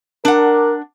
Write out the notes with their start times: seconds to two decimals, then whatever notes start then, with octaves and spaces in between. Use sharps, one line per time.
0.25 D4 A#4 F#5